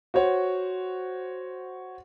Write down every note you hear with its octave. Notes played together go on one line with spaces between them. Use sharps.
F#4 C5 C#5 F#5